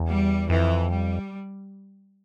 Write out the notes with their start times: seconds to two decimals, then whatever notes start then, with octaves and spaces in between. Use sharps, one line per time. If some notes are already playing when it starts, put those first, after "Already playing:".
Already playing: E2
0.09 G3
0.50 F2 E3
0.91 G3